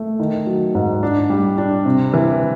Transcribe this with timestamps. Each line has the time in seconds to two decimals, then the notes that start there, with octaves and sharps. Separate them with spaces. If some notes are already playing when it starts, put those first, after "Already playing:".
Already playing: A3
0.20 D#3
0.46 F#3
0.75 G#2
1.03 D4
1.30 G3
1.58 D4
1.85 C3
2.14 E3